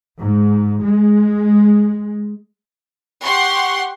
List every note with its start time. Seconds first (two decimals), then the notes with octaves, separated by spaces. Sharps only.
0.18 G#2
0.83 G#3
3.22 G4 F#5 C6 C#6